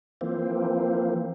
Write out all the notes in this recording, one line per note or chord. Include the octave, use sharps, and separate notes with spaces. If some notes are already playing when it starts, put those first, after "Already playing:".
E3 F3 A#3 C4